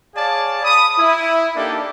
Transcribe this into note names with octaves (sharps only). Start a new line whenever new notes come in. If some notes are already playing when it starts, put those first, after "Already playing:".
G#4 C#5 D5 F5 A5
B5 D#6
E4
A#3 D4 D#4 G4 A4